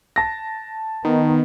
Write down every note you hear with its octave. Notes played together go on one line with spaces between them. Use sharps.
A5 A#6
D#3 B3